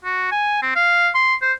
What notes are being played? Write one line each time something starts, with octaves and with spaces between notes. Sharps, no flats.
F#4
G#5
C4
F5
C6
C5